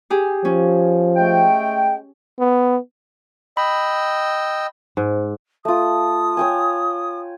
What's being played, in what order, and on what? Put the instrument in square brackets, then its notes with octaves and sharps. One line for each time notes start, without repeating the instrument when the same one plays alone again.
[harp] G4 G#4
[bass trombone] F3 [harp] C#4
[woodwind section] G#3 A3 G5
[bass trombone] B3
[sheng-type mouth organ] D#5 G5 E6 [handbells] B5
[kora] G#2
[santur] A3 F4 [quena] D#6
[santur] C#5 G5 G#5